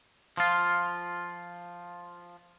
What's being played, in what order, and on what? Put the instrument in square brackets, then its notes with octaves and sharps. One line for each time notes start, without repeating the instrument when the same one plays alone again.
[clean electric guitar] F3 F4